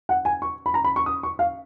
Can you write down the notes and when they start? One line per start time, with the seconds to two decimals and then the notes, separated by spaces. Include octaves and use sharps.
0.09 F#5
0.25 G#5
0.42 C#6
0.66 B5
0.74 A#5
0.85 B5
0.96 C#6
1.06 D#6
1.23 C#6
1.39 F5